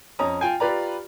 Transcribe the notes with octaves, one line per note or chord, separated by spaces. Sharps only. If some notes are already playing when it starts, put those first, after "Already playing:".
F2 C#4 D#5 A#5 D#6
F4 G5 G#5
F4 G4 B4 D5 A#5